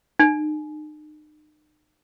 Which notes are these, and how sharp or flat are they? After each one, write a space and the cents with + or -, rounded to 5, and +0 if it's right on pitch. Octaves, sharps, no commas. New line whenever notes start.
D#4 -40 G#5 +30